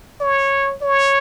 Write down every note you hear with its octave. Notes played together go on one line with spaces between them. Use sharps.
C#5
C#5